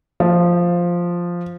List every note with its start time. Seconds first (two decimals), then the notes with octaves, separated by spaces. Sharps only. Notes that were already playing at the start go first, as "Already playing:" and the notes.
0.20 F3